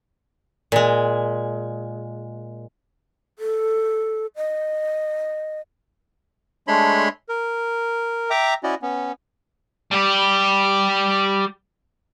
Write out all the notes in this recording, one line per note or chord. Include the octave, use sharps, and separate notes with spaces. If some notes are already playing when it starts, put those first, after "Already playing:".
A#2 G#3
A4
D#5
G#3 A3 D4 C#5 B5 C6
A#4
E5 G5 A#5 D6
C#4 E4 F#4 D5 D#5
B3 C#4
G3 G4